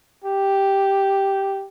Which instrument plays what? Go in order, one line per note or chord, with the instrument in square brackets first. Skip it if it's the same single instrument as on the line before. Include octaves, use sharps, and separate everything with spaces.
[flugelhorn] G4